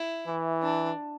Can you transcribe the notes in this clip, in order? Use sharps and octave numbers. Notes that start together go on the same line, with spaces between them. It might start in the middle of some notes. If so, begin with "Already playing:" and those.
Already playing: E4
E3
D4